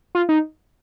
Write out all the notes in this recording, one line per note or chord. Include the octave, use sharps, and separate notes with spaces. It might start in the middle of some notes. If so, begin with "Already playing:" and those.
F4
D#4